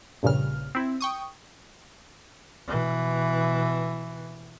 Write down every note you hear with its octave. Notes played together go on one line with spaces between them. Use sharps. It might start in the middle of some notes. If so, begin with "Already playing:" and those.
A#1 G2 A#2 C#3 F6
C4 E4
G5 C#6 D#6
B2 E3